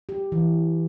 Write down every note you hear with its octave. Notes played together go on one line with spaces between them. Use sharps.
G4
E3